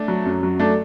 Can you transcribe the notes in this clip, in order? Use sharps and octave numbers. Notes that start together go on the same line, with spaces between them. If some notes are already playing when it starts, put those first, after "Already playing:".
Already playing: A3 D4
F#3
F#2
F#3
A3 D4